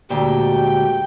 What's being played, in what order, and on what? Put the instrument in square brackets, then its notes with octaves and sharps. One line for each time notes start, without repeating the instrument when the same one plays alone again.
[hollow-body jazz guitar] D2 A#2 [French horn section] G#3 F#4 G4 [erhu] G5